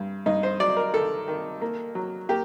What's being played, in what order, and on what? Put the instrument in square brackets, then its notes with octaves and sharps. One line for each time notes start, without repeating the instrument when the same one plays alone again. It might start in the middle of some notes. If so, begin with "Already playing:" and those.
Already playing: [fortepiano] G2
G2 D#4
C5
F#3 D5
A#4
D#3 A4
D#3
A#3
F#3
A#3 G4